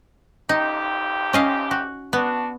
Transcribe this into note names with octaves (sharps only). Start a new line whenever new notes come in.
A1 F2 D#4 G4
C#4 D#5 F5
F#4
B3 D4 F#4